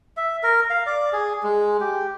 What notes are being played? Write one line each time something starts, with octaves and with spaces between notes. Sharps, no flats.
E5
A#4
F5
D5
G#4
G#3
G4